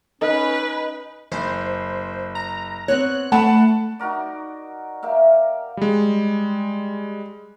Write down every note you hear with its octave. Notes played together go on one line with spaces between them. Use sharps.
C#4 D#4 B4
F#1 C5
A#5
B3 C4 C#5 F#6
A3 F#5 A5 B5
D#4 F#4 A#4 D5
G4 A#4 E5 F5
G3 G#3